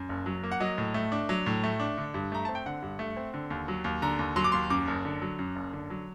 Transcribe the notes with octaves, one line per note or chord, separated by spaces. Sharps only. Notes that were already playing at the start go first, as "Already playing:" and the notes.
Already playing: F#2
F#1
F#3
A#3
F#5
F#3 D#5
A2
A3
D4
F#3
A2
A3
D4
D3
G2
A3 A#5
C4 A5
G5
D3 F#5
G2
A3
C4
D3
D#2
F#3
D#2
D3 A#5
D#2
F#3 C6
D6
D#2 C6
F#2 D6
F#1
D3
F#3
F#2
F#1
D3
F#3